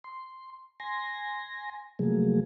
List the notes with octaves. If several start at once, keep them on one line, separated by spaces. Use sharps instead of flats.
C6
G#5 C6 A#6
C3 F3 F#3 A3 A#3 G#4